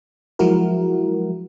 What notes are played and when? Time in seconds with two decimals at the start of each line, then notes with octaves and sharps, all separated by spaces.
0.39 F3 F#3 G#3 E4 F#4 A#4